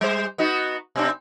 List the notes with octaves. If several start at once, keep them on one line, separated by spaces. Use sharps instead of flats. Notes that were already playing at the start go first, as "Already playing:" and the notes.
G3 C5
B3 D#4 F#4
B2 C4 D4